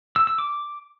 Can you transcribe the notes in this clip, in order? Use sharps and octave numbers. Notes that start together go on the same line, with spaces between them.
E6
E6
D6